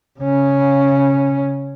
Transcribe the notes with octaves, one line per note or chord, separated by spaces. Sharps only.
C#3 C#4